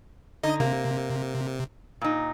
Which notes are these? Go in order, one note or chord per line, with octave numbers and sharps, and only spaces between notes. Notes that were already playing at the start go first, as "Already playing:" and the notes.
D3 D#4 D#5
C3 A#3
A#2 D#4